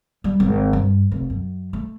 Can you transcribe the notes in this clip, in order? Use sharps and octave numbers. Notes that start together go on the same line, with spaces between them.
G3
G#1
G2
F1
F#2
A3